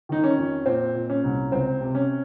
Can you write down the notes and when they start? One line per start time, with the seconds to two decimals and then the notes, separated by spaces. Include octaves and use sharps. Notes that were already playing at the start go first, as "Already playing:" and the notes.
0.09 D#3 D#4
0.24 C#4
0.38 F2
0.66 A#2 C4
0.94 A#2
1.10 C#4
1.24 C2
1.52 C#2 C4
1.81 C3
1.95 C#4